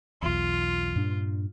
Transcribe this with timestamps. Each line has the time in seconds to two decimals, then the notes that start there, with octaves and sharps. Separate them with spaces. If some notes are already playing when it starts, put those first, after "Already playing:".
0.22 B1 E2 F4
0.96 G2 A#2 D4